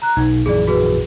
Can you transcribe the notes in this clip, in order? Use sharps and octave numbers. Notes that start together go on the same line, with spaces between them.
A#5 F#6
B1 D#4
A#1 F#2 E3 G#4 D5
F#4 G#4 B4